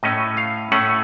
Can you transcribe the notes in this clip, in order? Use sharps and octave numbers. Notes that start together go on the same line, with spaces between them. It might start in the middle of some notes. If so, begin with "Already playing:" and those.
A2 A3 C#4 D#5
F5
A2 A3 C#4 F#5